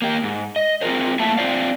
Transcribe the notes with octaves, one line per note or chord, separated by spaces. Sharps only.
A#3 G4
G#2
D#5
C4 F4 G#4 A#4 C5
A2 A3 A#3 E5 A5
C4 D4 F4 C5 D5 F5